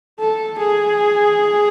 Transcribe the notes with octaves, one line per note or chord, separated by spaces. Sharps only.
A4
G#4